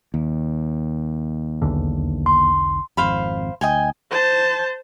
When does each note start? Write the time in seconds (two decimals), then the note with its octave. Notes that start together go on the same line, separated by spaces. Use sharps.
0.14 D#2
1.62 B1 E2 D3
2.26 C6
2.97 G#1 F2 C5 F5 B5
3.61 D2 D#5 G5 G#5
4.11 C5 A5